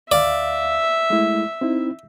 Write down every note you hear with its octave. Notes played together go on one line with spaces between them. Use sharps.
D2 D5 E5 F5
G#3 A3 E4
C4 D#4 E4